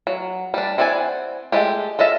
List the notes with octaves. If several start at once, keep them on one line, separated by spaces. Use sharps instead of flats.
F#3
G3 D4
C4 E4 D5 F#5 G#5
G#3 A3 G4
F4 A4 D#5 E5